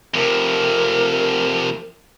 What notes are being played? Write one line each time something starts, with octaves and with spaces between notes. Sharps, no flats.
F2 C3 A#4